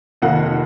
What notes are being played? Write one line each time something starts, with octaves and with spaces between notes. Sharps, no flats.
F1 F2 D#3 A#3 F#5